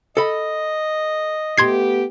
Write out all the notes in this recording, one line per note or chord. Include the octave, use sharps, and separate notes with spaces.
A4 D#5 B5
A3 B3 G4 C6 G#6 C7